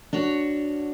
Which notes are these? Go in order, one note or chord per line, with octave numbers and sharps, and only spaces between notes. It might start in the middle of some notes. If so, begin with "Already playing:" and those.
D4 F#4 C#5